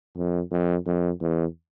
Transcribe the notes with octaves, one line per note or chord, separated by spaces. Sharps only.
F2
F2
F2
E2